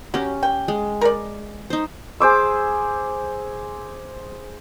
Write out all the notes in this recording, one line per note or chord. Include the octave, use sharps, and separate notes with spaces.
F#3 C#4 G4
G5
G#3
A#4 D5
D#4 C5
G#4 C5 D6 E6